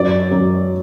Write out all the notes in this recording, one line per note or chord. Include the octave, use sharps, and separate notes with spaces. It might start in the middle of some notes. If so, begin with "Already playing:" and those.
Already playing: F#2 F#3 D5
F#2